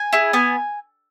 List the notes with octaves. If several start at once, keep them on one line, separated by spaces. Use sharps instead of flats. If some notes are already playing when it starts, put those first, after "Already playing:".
Already playing: G#5
E4 G#4
B3 G#5